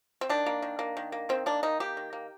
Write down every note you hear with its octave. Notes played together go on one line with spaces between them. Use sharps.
C4
D#3 D4
A#3
D#3
A#3
D#3
A#3
D#3 C4
A#3 D4
D#3 D#4
A#3 G4
D#3
A#3